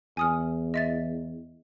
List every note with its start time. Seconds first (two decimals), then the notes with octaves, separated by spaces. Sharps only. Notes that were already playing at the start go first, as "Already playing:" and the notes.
0.17 E2 G#5 D#6 F6
0.74 D#5 E5 A6